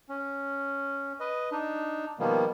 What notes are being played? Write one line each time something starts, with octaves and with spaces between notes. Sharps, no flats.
C#4
B4 D#5
D4 D#4
B2 D#3 F3 G3 A#3 B3